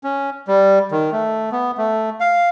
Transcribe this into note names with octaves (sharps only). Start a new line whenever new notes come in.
C#4
G3
D#3
A3
B3
A3
F5